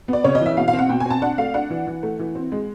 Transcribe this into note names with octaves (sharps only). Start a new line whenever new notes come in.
B3 D5
C#3 C#5
D#5
E3
E5
B2 F5
F5
C4
F#5
B2 G5
G#5
C4 A5
D4 F#5
A3 F5
D4 F#5
E3
E3
A3
E3
C4
G#3